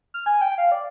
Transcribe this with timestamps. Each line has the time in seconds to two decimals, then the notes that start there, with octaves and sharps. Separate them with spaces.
0.14 F6
0.26 G#5
0.41 G5
0.58 F5
0.72 D5